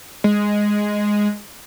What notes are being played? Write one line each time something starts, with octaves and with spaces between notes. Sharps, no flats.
G#3